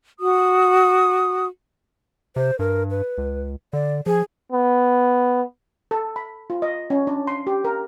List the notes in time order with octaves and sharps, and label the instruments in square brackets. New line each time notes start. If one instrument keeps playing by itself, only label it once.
[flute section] F#4 D#6
[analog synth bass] C3 [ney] C5
[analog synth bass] G2 [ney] A#4
[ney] B4
[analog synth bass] C#2
[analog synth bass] D3 [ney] D5
[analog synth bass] F3 [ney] G#4
[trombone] B3
[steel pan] A4
B5
F4
D#5
C#4
D4
C6
G4
A#4